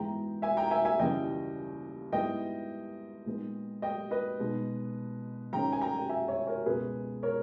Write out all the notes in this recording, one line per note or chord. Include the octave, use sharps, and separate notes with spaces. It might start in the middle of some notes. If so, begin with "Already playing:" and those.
Already playing: G#2 E3 G#3 B3 G5 A#5
E5 G#5
G5 A#5
E5 G#5
E5 G#5
D#2 C#3 E3 G3 D#5 G5
G#2 G3 B3 E4 D#5 G5
A#2 G#3 B3 D#4
D#5 G5
B4 D#5
B2 G#3 D#4
G#2 D#3 G#3 C#4 G5 A#5
G#5
G5 A#5
G5
E5 G#5
C#5 E5
A#4 C#5
C#2 B2 G#3 G#4 B4
A#4 C#5